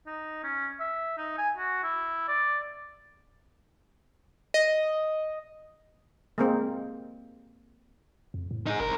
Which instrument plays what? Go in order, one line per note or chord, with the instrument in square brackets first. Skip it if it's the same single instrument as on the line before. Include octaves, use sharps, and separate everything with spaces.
[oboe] D#4
C#4
E5
D#4
G#5
F#4
E4
D5
[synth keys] D#5
[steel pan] G#3 A#3 C4
[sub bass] F2
A2
[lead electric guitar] D#4 G#4
[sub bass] G1 [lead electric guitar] C2 A#4